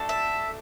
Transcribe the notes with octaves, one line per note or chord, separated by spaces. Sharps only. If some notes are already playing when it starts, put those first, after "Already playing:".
Already playing: A3 D4 F#4 A4
E5